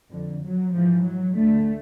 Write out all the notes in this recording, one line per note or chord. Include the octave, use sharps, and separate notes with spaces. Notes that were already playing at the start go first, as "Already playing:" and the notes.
F2 D3
F#3
G#2 E3 F3
F#3
D2 D3 A3